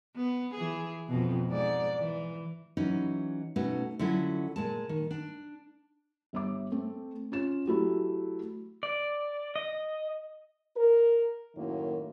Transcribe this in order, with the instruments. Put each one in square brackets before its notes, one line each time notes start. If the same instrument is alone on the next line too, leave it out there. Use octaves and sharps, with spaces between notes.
[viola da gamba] B3
E3 G#4
F2 B2
G#2 D5
E3
[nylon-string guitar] E3 F#3 C#4 D#4
B2 A3 C#4 D#4 F#4
D3 F#3 C#4 E4 F4 A4
A#2 G#3 A5
D#3
D4
[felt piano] G1 E5 D6
A3 C4
C#4 F4 E7
F#3 A3 E4 G4
[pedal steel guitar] D5
D#5
[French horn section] A#4
F#2 A2 D#3 A#3